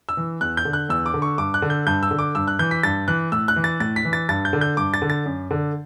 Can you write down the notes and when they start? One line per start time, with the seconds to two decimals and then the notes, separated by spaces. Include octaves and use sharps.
0.09 E6
0.17 E3
0.41 E2 F#6
0.57 G6
0.65 D3
0.73 F#6
0.89 E2 E6
1.06 D6
1.14 D3
1.22 C#6
1.38 G2 D6
1.54 F#6
1.62 D3
1.70 G6
1.87 G2 G6
2.03 E6
2.11 D3
2.19 D6
2.35 G2 E6
2.48 F#6
2.59 E3 G6
2.71 B6
2.83 G2 A6
3.08 E3 F#6
3.32 A2 E6
3.48 F#6
3.56 E3
3.64 A6
3.80 A2 A6
3.96 B6
4.05 E3
4.13 A6
4.29 G2 A6
4.45 G6
4.53 D3
4.61 G6
4.77 G2 D6
4.94 A6
5.02 D3
5.10 A6
5.26 F#2
5.51 D3